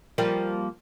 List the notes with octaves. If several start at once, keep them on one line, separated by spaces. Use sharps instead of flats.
F3 G3 A#3